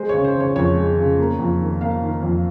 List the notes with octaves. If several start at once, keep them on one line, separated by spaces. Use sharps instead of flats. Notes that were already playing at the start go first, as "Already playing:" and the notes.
Already playing: G#3 C5
C#3 C#5
C5
C#3 C#5
F2 C#5
G#3
C#3
A#3
F2
D#3
A#3 F5
D#3
F2